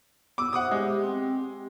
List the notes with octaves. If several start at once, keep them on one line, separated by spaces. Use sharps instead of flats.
B3 D6 E6
C5 E5 F#5 D6 D#6
G#3 G4
C4 G5
G4